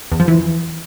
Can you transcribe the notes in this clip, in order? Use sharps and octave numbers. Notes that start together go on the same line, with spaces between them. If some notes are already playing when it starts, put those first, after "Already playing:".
E2
F3
E3